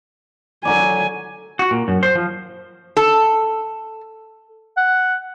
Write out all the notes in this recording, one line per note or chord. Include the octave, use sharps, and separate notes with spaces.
D3 F#3 D5 G#5
F#4
A#2
F#2
C5
F3
A4
F#5